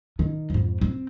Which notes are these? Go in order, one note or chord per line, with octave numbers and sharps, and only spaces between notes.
D#3
F2 G#2
C4